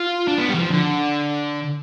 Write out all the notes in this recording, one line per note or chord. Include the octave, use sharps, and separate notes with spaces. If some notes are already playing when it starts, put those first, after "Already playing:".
Already playing: F4
D4
B3
G3
E3
F3
D3